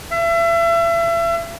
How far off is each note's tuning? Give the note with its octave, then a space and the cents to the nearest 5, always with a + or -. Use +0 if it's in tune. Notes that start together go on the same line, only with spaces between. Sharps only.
E5 +35